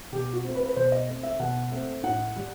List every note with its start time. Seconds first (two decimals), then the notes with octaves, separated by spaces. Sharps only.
0.12 B2 G4
0.33 F#4
0.44 A3 C4
0.55 B4
0.66 B4
0.76 B2 C5
0.92 D#5
1.08 A3 C4
1.23 E5
1.39 B2 F#5
1.72 A3 C4
2.03 A2 F#5
2.36 G3